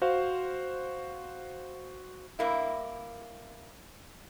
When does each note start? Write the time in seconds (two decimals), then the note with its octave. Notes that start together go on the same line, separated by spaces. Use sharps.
0.02 F#4 C5 F5
2.39 G2 A#3 E4